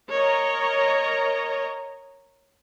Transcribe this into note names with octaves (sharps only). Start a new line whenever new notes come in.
A#4 C#5 D#5 A#5